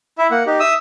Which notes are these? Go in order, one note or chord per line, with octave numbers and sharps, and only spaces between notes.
E4 E5
A#3 F#5
D#4 G4
E5 D#6 E6